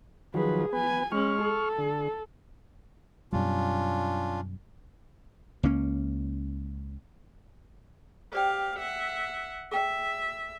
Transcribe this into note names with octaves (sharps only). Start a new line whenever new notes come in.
D#3 F3 F#3 G#4 B4
B3 B4 G#5
G#3 C#4 C#6 F6
A4
D3
F#2 B2 G3 C#4 D4 F4
C#2 A#3 C#4
G4 C5 D5 F5 G5
E5 F#5
G#4 E5 G5